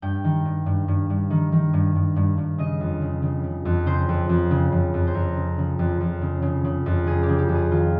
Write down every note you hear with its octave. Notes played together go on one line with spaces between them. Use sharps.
G2 G5
D#3
G2
G2
G2
G2
D#3
D#3
G2
G2
G2
G2
C#3 D#5
F2
C#3
C#3
C#3
F2
C#3 C5
F2
F2
C#3
F2
F2
C5
F2 A#4
C#3
C#3
F2
F2
C#3
C#3
C#3
F2
C#3 G#4
G4
C#3
G4
F2
G#4
D#3 F4